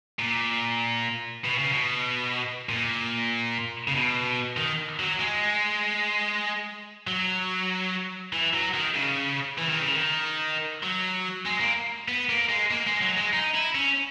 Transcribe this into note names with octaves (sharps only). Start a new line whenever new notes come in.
A#2
B2
C#3
B2
A#2
C#3
B2
D#3
F#3
G#3
F#3
E3
F#3
D#3
C#3
E3
D#3
C#3
D#3
F#3
G#3
A#3
B3
A#3
G#3
A#3
G#3
F#3
G#3
D#4
E4
C#4